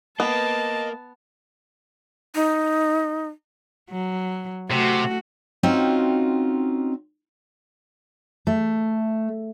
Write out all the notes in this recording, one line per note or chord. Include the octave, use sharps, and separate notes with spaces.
A#3 B3 D#5 A5
D#4
F#3
C3 A3 F#4
C4 C#4 D#4 F4 F#4 G5
A3